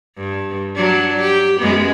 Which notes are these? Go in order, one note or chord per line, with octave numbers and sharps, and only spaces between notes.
G2
F#3 D4
G4
F#2 G#3 B3